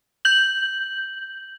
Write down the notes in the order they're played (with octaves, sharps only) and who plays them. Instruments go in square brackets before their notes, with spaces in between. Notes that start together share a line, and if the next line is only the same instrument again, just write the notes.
[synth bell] G6 F#7